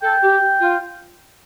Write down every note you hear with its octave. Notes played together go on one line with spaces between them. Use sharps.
A4 G5
G4
F4